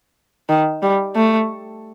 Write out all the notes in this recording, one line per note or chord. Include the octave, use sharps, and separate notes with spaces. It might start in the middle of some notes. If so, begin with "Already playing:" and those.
D#3
G3
A3